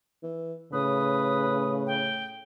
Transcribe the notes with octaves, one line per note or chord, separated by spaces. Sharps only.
E3
A2 C#3 B4 D#6
G5